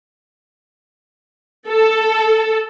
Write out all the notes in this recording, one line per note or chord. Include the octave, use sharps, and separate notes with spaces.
A4